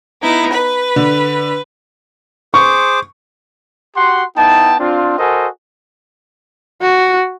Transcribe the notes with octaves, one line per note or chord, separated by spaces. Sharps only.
B3 D#4 E4
B4
D3
G#4 C5 C#6 D6
F#4 G4 F#5 C6
B3 D#4 E4 G5 A5
C4 D4 F4
F#4 A4 A#4 C5 D#5 G#5
F#4